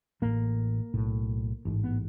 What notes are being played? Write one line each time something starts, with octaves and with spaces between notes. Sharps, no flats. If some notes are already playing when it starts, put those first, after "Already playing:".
A1 A2 A#3
B1 A2
A1 G#2
B3